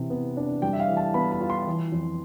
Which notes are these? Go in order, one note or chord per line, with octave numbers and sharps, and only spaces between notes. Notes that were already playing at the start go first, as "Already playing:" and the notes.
Already playing: C3 E3
B3
D4
G3 G5
E5
F5
E3
A5
B3 B5
B5
F4
C6
E3
F2